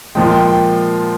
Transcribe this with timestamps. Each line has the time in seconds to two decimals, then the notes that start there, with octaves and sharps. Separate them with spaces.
0.15 A#2 F3 G#3 G5
0.31 G5
0.47 G5